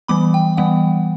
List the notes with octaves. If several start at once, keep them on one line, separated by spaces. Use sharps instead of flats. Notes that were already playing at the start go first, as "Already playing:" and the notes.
E3 G3 B3 B5 D6
G5
E3 G3 B3 F#5